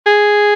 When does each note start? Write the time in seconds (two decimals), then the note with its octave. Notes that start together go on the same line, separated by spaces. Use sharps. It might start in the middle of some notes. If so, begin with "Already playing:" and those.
0.06 G#4